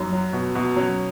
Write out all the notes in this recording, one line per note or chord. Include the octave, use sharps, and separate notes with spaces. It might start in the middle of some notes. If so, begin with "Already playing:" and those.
Already playing: F#2 D#4
F#3
B2
B2
F#3 C#4